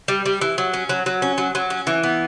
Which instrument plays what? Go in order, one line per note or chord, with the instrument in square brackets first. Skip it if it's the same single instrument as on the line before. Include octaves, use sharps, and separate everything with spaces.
[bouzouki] G3
G3
E3
F#3
C#4
F#3
F#3
C#4
F#3
F#3
C#4
E3
B3